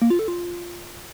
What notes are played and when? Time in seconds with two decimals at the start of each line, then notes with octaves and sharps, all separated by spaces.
0.02 A#3
0.10 F4
0.19 A4
0.28 F4